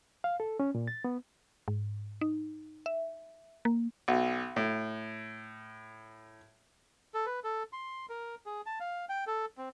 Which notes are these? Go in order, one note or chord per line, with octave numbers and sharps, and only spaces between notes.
F5
A4
C#4
A#2
A6
B3
G#2
D#4
E5
A#3
B1
A2
A4
B4
A4
C6
A#4
G#4
A5
F5
G5
A4
C4